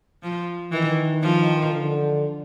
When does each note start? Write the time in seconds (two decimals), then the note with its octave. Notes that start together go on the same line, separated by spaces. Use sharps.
0.23 F3
0.72 D#3 E3
1.22 F3
1.72 D3